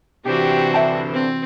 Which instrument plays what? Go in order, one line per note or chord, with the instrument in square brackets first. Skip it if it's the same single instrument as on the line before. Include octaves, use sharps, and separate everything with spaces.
[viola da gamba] C3 E3 C5 [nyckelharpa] D4 F#4 [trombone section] G4
[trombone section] G2 D3 [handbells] E5 G5 A5
[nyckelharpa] C4